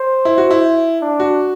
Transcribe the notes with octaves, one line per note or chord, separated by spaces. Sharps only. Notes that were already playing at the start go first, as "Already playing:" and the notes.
Already playing: C5
E4
F#4
E4
D4
F#4